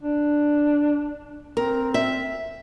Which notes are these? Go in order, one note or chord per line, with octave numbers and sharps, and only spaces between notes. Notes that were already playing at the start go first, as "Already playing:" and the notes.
D4
C4 A#4
E5